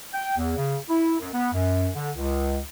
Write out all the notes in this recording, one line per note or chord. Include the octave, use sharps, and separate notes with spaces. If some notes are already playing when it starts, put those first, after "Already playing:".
G5
E2
C#3
E4
F#2
B3
F#2
D3
C#2